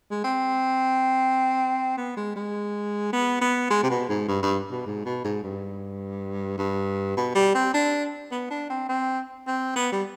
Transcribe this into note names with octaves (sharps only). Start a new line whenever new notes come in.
G#3
C4
B3
G#3
G#3
B3
B3
G#3
C3
B2
G#2
G2
G2
B2
G#2
B2
G#2
G2
G2
B2
G3
C4
D4
B3
D4
C4
C4
C4
B3
G3